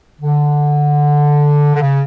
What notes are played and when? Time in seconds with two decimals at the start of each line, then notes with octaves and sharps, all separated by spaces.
0.22 D3
1.75 D3
1.81 C#3